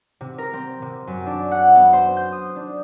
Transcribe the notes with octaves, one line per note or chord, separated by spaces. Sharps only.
C3
A#4
C4
C3
F#2
D4
F#5
B3
C5
G6
D#6
D4